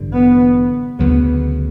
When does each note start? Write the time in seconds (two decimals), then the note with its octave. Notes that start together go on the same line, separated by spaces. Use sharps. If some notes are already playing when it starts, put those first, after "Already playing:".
Already playing: A1 G2 D3
0.12 B3
0.99 D2 C#3 F#3 B3